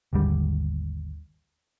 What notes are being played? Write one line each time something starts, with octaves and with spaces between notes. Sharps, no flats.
G#1 D#2 D3 G3